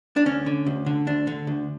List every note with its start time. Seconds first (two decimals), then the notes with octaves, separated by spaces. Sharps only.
0.16 D4
0.26 D2 C#4
0.46 D3
0.66 D2
0.86 D3
1.07 D2 D4
1.27 D3
1.47 D2